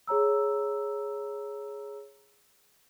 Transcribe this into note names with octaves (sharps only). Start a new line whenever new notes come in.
G#4 C#5 A#5 E6